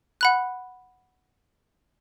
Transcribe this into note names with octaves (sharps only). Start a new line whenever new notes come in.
F#5 B5 F#6